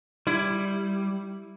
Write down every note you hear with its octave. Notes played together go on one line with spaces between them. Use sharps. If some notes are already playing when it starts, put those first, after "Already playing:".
G3 E4